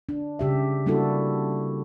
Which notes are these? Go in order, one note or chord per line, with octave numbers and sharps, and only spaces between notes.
D4
C#3 G4 E5
G3 A#3 D4 E4 F#4 A4